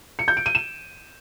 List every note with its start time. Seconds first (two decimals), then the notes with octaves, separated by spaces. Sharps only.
0.19 C#7
0.28 G6
0.37 D7
0.46 D#7
0.55 E7